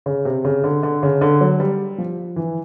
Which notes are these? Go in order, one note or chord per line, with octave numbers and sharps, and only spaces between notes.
C#3
C3
C#3
D3
D3
C#3
D3
F#3
G3
F3
E3